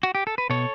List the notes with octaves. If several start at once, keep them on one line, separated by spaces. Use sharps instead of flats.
F#4
G4
A4
B4
B2 A4 C#5